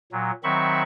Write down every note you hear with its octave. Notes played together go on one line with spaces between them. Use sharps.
A#2 F#3
D#3 F#3 C4 E5 B5 C#6